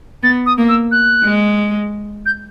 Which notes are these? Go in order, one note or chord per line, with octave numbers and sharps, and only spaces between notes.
B3 A6
D#6
A#3
E6
F#6
G#3
G6